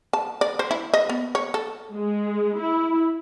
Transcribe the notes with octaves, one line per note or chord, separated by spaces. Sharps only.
A5
D5
C5
E4
D#5
B3
C#5
A4
G#3
E4